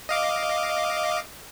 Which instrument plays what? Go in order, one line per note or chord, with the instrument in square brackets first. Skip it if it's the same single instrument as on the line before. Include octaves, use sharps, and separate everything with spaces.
[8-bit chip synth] D#5 F5 D6